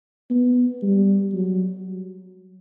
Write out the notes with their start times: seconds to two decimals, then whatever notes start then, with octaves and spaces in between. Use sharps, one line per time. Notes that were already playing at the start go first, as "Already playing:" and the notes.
0.30 B3
0.82 G3
1.34 F#3